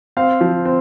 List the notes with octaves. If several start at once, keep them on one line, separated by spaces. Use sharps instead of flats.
C4 F5
F3
C4